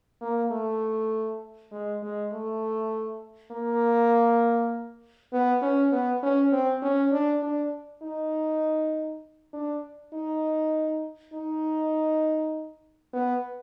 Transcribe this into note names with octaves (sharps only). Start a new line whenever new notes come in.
A#3
A3
G#3
G#3
A3
A#3
B3
C#4
B3
C#4
C4
C#4
D4
D4
D#4
D4
D#4
D#4
B3